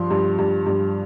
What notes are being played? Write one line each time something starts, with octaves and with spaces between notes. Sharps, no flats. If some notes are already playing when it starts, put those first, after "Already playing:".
Already playing: G2 F3 C6
G2
G2
G2